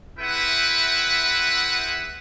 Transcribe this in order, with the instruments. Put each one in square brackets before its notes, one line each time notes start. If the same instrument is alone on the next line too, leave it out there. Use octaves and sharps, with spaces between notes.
[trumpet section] C4 E4 G#4 B4 E5 F#5